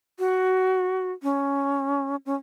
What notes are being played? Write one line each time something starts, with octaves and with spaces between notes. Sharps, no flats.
F#4
C#4
C#4